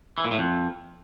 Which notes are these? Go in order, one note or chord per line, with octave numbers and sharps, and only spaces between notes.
E3
A#2
A2
F2